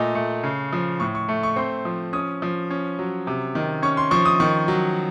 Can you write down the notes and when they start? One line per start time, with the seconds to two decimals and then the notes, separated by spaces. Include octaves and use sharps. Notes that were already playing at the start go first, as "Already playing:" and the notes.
Already playing: A#2 A3 D#5
0.15 A3
0.44 C#3
0.73 F3
1.00 A2 C#6
1.15 C#6
1.28 A3
1.43 C#6
1.56 C4 C6
1.85 F3
2.13 C#4 D#6
2.42 F3
2.70 C#4
2.99 F#3
3.27 C3
3.55 D#3
3.83 C#4 C#6
3.97 C6
4.11 F3 C#6
4.25 D#6
4.40 D#3 C#6
4.68 F#3